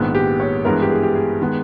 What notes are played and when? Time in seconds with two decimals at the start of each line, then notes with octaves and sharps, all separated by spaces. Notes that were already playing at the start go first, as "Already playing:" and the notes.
Already playing: A#1 G#2 D#3 G#3 B3
0.15 G4
0.40 C#5
0.65 G2 E3 G#3 B3 A#4
0.81 G4
0.90 G#4
1.03 G4
1.15 G#4
1.41 D#3 G#3 B3